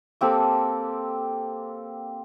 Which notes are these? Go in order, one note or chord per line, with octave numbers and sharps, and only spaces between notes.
A#3 C4 G4 A4